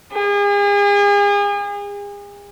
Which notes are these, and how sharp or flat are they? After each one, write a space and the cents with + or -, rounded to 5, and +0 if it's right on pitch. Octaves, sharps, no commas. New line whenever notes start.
G#4 -40